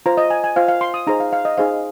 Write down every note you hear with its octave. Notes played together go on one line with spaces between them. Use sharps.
F4 C5 A#5
D#5
G#5
G#5
F4 C5 F5
F5
C6
D#6
D#4 G#4 C5 A#5
F5
F5
D#5
D#4 G#4 C5 F5